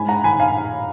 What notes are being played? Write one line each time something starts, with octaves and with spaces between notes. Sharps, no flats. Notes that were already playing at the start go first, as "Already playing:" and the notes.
Already playing: G#2 G#5 B5
F#5 A#5
D#3 G#5 B5
F5 G#5